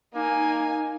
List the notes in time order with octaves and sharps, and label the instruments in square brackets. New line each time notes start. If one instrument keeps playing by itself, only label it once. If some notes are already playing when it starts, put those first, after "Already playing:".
[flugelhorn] A#3 [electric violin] D#4 G#5